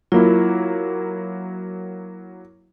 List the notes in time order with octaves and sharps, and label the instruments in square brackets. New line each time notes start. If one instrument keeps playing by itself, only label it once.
[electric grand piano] F#3 A#3 E4 [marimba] F4